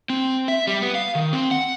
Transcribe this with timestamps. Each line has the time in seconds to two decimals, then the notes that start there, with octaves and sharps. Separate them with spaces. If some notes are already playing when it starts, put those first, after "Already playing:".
0.10 C4
0.48 E5
0.67 G3
0.82 B3
0.95 F5
1.15 D#3
1.33 C4
1.51 F#5